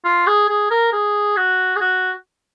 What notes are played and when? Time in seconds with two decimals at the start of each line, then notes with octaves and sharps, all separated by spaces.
0.05 F4
0.27 G#4
0.49 G#4
0.71 A#4
0.93 G#4
1.37 F#4
1.76 G#4
1.81 F#4